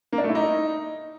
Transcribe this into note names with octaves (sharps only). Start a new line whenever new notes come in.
A#3
D4
A3
E4
D#4